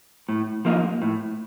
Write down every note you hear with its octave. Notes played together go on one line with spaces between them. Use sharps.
A2
F3 A#3 D#4
A2